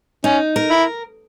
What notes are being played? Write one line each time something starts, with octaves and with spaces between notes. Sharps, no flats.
C#4 D#4
A#4
E4